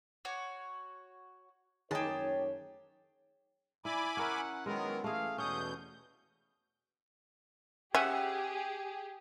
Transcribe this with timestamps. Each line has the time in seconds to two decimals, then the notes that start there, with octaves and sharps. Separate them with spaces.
0.25 F#4 C#5
1.91 F#2 D#3 A3 D#4 G4 G#4 C#5 A5
3.85 E4 D5 G#5 B5 D6
4.17 C#4 A#4 E5 F#5
4.66 D#3 F#3 G#3 B3 A#4
5.04 E3 A3 G#4 F5
5.38 E2 B2 G#3 C#4 F#5 D#6 G6
7.95 C#4 G4 G#4 E5 F#5